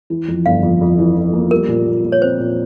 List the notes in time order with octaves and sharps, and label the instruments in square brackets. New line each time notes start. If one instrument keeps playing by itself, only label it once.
[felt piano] E3
F2
[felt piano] G1 [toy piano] F5
[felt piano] F2
F2
E3
E3
A#3
[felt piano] G3 [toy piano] A#4
[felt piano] A#2
A#2
A#2
[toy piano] C#5
[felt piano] C4 [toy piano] C5
[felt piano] A#2